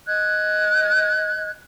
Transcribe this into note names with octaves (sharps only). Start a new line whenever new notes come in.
D#5 F#6 G#6